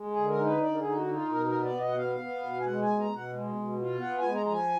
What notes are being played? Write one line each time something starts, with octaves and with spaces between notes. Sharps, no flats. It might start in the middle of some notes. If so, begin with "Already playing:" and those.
Already playing: G#3
G#4
D3
A#4
D#4
B4
D3 D5
A#4
G#4
D#4
F#4
D#4
F4
B2 A#4
A#4
B3
D5
B2
D#5
F#5
B3 F5
B3
B2
G#5
G#3 F#5
G#5
B2
A#5
B2
F#5
G#3
B2
F4
B3 F#5
G#5
G#3
A#5
F3 A#5
G#5